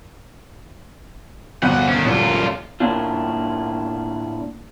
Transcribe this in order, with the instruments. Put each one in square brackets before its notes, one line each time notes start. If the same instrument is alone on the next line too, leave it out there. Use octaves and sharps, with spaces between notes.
[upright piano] G1 F#6 D#7 [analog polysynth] D2 [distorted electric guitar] A#2 F#5
[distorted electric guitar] D#3 C#4
[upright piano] D#1 F#3 [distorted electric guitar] F#2 F4 [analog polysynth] A#2
[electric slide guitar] A2 A#3 C#4 D4 F4